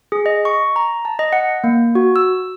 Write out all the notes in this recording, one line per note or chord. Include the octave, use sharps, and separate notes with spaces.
G#4
D#5
C#6
A#5
A5
D#5
F#5
A#3
F#4
E6